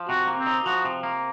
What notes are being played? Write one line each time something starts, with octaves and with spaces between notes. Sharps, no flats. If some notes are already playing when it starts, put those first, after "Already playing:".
Already playing: F3
C3 F#4
A#3
C4
D#4
F3 F#4
C3
A#3